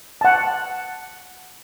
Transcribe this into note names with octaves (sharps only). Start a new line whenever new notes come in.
F#5 A5